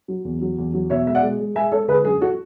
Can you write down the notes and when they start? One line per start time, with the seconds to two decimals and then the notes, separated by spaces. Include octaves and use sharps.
0.08 F#3
0.25 E2
0.41 F#3
0.58 E2
0.73 F#3
0.90 B2 C#5 E5
1.06 G#3 E5
1.15 D5 F#5
1.23 G#3
1.40 G#3
1.55 G#3 E5 G#5
1.72 G#3 A4 C#5
1.88 D3 G#4 B4
2.05 F#2 G#4
2.21 F#4 A4